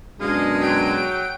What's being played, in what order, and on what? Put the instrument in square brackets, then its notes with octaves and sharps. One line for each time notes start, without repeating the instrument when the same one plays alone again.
[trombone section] F#2 B2 D4 [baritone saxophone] G#3 [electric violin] D#5 F5
[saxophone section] F#3 [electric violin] G5 D7